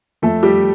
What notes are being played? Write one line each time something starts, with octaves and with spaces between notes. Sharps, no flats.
F2 A3 A4
G3 G4